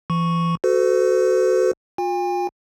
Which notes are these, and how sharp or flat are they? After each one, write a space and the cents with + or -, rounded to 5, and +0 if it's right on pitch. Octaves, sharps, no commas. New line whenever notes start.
E3 +40 C#6 +0
F#4 +5 A4 +0 C5 -45
F4 +35 G#5 -45